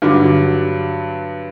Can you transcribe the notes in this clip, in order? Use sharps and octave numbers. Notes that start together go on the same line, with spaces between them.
G2 D3 F#3 D6